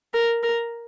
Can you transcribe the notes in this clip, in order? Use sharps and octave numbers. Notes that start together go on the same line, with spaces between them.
A#4
A#4